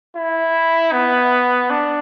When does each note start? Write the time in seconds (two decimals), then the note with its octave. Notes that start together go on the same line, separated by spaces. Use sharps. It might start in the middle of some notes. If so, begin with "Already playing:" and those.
0.16 E4
0.93 B3
1.70 D4